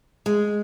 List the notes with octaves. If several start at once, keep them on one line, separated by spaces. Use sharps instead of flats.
G#3